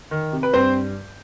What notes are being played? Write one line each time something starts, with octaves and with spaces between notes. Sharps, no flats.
D#3
C3
B4
G2 C4 C5